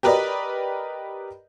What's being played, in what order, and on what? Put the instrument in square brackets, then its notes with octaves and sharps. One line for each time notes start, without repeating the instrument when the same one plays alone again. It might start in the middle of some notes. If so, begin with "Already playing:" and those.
[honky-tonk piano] G4 A#4 B4 D5 D#5